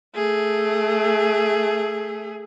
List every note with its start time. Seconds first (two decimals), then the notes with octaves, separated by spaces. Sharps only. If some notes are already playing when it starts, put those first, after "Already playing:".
0.15 A3 G#4